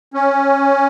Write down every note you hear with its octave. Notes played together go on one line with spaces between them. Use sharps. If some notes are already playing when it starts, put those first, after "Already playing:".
C#4